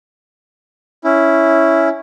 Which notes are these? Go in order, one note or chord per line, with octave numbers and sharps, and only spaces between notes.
C#4 E4